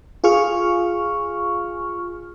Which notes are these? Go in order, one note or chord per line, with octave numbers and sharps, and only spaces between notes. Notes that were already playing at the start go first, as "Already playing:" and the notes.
F4 G#4 C#6 F6